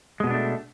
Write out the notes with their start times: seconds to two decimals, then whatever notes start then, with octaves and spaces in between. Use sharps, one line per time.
0.20 G#3
0.24 B2
0.27 B3
0.30 D4
0.34 A3